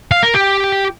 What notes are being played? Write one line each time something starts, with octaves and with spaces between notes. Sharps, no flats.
F5
A#4
G4